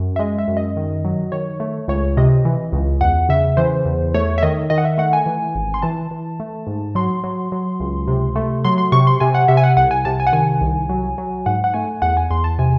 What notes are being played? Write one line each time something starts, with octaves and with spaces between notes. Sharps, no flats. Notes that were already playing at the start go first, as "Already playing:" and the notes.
Already playing: F#2
E5
G#3 D#5
E5
F#2
D#5
D#3
F#3
D#3 C#5
A3
C#2 C#5
C3 D#5
E3
C#2
E2 F#5
C#3 E5
E3 C5
E2
A3 C#5
E5
D#3 D#5
D#3 D#5
F#5
E5
A3 F#5
G#5
E3
G#1
C6
E3 A5
E3
A3
G#2
F#3 C6
F#3
F#3
C#2
C3
A3
F#3 C6
C6
C3 C#6
C6
C3 G#5
F#5
C3 E5
G#5
F#5
C2 F#5
G#5
C3 A5
G#5
F#5
D#3 G#5
C2
F#3
F#3
G#2 F#5
F#5
A3 G#5
E2 F#5
G#5
E2 C6
A5
C3 G#5